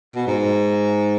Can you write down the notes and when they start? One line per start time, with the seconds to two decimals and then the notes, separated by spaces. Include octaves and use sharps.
0.16 B2
0.27 G#2